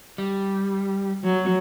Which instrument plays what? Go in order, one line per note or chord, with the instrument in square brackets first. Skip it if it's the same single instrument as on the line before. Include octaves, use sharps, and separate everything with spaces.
[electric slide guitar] G3
[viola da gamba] F#3